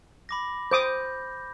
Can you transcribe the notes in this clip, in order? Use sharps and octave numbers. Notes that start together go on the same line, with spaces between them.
B5 D6 A#6
C5 D6 D#6 G6